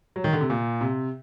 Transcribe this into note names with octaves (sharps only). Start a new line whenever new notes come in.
F#3
D#3
D3
C3
A#2
C3